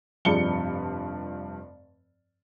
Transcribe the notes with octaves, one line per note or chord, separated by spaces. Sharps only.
F1 G2 F3 D5 C#7 G7